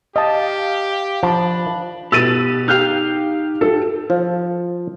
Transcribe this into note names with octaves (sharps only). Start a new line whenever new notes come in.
G4 D#5 F5 A5
F3 D4 B5
B2 G4 E6 A6 D#7 F#7
D#4 G4 F5 F6 G6
A4
F3